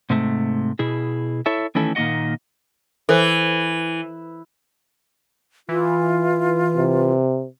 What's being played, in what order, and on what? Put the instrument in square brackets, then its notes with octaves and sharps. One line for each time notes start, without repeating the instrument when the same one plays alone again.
[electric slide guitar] G#2 C3 A3
B2 E4 G#4
E4 A4 C#5 E5
D#3 E3 A3 C#4 E4 A4
A#2 D#3 A#3 F#4 D#5 F#5
[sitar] E3 [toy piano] A4 C5
[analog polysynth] E3 [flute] F4
[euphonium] C3